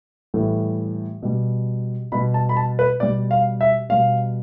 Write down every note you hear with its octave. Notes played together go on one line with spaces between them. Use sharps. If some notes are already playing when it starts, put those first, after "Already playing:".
A2 E3 G3
B2 G3
B2 G3 B5
A5
B5
A5
B4
B2 G3 D5
F5
E5
B2 G3 F5